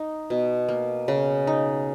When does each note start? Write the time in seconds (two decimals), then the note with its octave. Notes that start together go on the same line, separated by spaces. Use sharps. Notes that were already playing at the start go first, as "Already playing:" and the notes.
Already playing: D#4
0.30 B2
0.69 A#3
1.08 C#3
1.47 D#4